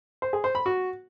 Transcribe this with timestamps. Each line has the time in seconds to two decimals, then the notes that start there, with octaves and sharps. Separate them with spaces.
0.22 C5
0.33 G#4
0.44 C5
0.55 B5
0.66 F#4